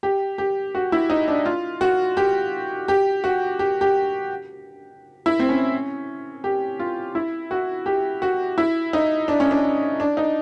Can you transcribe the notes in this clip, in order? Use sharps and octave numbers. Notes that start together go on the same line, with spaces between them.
G4
G4
F#4
E4
D#4
D4
F4
F#4
G4
G4
F#4
G4
G4
E4
C4
C#4
G4
F4
E4
F#4
G4
F#4
E4
D#4
D4
C#4
D4
D4
D#4